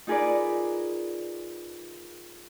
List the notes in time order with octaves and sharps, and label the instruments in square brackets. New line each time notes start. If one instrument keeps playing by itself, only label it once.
[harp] D#4 F4 G#4 A#4 B4 D5